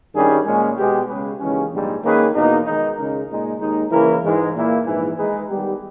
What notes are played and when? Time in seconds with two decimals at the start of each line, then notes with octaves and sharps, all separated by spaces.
0.14 G2 D#3 G3 C#4 G#4
0.46 A#2 G#3 C#4
0.77 B2 G#3 B3 G4
1.08 C#3 G#3 C#4 G#4 B4
1.39 D#2 C#3 E3 G#3 C#4
1.71 A#1 G#2 G3
2.03 D#3 A#3 C#4 G#4 B4
2.34 E2 B2 A#3 D#4
2.65 D#3 G#3 D#4
2.97 C#2 C#3 G#3 D#4 A#4
3.29 A#2 G#3 D#4
3.60 D#2 D#3 G#3 D#4
3.91 C#3 E3 A#3 E4 A#4
4.23 G#2 E3 G#3
4.54 A#2 A#3 E4
4.86 A#1 G#2 E3
5.18 D#3 G#3 D#4 G#4 B4
5.49 D#3 G3 B3 G4